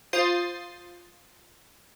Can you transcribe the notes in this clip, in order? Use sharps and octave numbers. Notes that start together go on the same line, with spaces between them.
F4 C5 D#6 G6 A6 C7